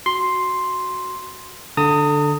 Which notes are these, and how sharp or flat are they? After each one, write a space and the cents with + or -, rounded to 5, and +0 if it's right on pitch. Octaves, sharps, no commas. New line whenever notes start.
F#4 +0 C6 +0
D3 +0 A#5 -45 D#6 +0